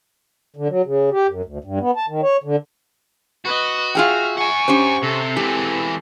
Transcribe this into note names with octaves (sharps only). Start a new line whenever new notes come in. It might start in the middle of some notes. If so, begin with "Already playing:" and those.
D3
F#3
C#3
G4
F#2
D2
G2
B3
A5
D#3
C#5
D3
F#4 B4 D#5
F4 G#4 E5 G5 F6
F#5 G#5 C#6
C#4 G4 C5
C3 C4 A4
E3 G#3 G4